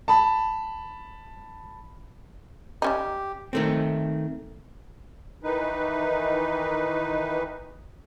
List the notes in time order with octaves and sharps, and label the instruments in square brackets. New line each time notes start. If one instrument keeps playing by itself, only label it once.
[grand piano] A5 B5
[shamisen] G3 C#4 D#4 [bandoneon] G4
[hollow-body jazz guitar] D#3 A3 C4
[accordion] D#3 E3 D#4 B4